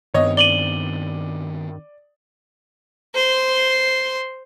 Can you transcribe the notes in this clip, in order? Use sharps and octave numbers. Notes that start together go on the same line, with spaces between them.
G2 D#3 B3 C4 C#5 D#5
D5 D#7 F#7 G7
C5 C6